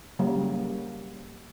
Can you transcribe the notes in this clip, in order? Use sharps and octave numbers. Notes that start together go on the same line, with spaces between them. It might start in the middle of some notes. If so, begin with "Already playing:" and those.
C#3 F#3 G3 A#3 F#4